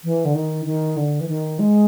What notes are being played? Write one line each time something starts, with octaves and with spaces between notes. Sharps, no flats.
E3
D3
D#3
D#3
D3
E3
D#3
G#3